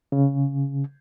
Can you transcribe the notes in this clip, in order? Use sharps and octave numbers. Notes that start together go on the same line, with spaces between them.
C#3